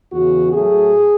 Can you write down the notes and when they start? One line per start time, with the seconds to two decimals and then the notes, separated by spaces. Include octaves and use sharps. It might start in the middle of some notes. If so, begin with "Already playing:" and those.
0.13 E2 C#3 E3 F#4
0.53 A2 F#3 A3 G#4